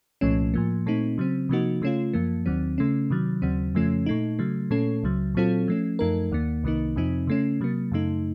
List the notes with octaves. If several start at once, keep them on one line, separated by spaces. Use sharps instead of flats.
C2 A#2 F3 A3 C#4
A2 F3 A#3
A#2 A3 C4 D#4
C#3 F#3 C4
C3 F3 A#3 D#4 F#4
C#3 A3 C#4 F4
F#2 F3 A#3
D#2 D#3 F#3 C4
C#3 A3 C#4
C3 D#3 F#3
D#2 C#3 F#3 C4
F2 C#3 F3 A3 C#4
A#2 A3 D#4
C#3 F#3 A3
A#2 A3 C#4 A4
C#2 C#3 F#3
A#2 F#3 C4 F4 A4
F3 A3 C#4
F#2 F3 A3 D#4 A#4
D#2 D#3 A#3
C2 C3 D#3 A#3 D#4
F2 C3 F3 C4 D#4
C#3 A3 C#4
C3 F#3 A#3
F#2 C#3 A3 D#4